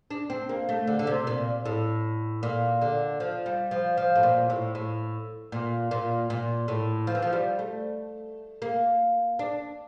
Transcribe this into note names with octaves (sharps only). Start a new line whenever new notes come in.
D4
C4
A#3
A3
D3
D3
C3
A#2
A2
A#2
D3
F3
G3
F3
F3
A2
A#2
A2
A2
A#2
A#2
A#2
A2
F3
E3
F3
G3
A3
A#3
D4